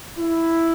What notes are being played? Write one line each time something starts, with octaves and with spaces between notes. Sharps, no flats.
E4